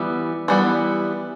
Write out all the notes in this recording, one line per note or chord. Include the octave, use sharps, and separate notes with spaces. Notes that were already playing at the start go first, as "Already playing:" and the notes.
Already playing: E3 G3 B3
E3 G3 B3